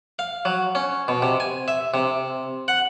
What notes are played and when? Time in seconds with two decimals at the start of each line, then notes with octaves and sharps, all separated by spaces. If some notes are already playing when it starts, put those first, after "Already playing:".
0.19 F5
0.45 F#3
0.75 C#4
1.08 B2
1.22 C3
1.40 G#5
1.68 E5
1.94 C3
2.68 F#5